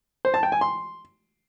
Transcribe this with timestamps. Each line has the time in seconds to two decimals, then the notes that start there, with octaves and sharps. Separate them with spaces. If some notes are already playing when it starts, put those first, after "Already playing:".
0.25 C5
0.34 A5
0.43 G5
0.52 G#5
0.61 C6